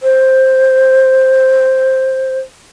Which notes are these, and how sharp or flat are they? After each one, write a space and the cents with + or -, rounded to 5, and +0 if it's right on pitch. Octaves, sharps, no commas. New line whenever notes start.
C5 +5